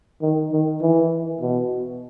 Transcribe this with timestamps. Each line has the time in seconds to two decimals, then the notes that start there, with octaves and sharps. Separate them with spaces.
0.22 D#3
0.52 D#3
0.81 E3
1.41 B2